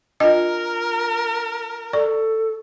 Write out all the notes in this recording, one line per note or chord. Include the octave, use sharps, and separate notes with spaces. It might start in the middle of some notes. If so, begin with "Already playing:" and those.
D4 F4 A#4 D#5
A4 D5 C#6